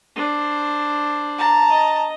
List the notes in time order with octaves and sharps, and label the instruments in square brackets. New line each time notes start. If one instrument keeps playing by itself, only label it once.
[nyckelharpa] D4 C5
[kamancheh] A5 A#5
[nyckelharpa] D#5